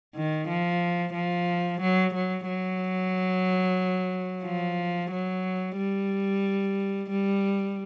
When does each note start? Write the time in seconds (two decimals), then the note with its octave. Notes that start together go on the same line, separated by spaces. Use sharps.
0.15 D#3
0.48 F3
1.14 F3
1.80 F#3
2.13 F#3
2.47 F#3
4.45 F3
5.11 F#3
5.77 G3
7.10 G3